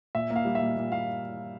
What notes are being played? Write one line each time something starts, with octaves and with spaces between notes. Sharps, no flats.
A#2 E5
A#3
F5
G3
E5
A#2
A#2
A#3 F5